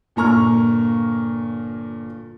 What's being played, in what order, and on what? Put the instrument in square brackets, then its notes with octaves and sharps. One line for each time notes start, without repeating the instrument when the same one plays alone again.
[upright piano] G1 A#2 A#3 A#5 C#6 F6